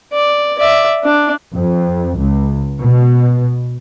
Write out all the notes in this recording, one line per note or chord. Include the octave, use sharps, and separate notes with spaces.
D5
D5 E5
D4
F2
C#2
B2